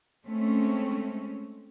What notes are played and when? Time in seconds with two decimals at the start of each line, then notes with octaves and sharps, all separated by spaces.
0.25 G#3 A3 C4 C#4